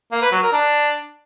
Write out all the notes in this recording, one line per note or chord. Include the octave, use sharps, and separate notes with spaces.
A#3
B4
F#3
A#4
D4